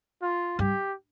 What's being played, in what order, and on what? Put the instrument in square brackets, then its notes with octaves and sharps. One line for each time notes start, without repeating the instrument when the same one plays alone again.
[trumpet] F4
[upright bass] G2 [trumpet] G4